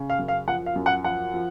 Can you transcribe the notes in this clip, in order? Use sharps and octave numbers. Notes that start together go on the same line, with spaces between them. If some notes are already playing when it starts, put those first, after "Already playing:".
Already playing: C#3
F5
F#2
F5
F3 F#5
F5
F#2
F#5
F3 F#5
F3